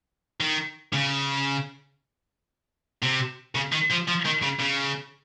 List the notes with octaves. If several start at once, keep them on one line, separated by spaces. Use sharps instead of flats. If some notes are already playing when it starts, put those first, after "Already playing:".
D#3
C#3
C3
C#3
D#3
F3
F3
D#3
C#3
C#3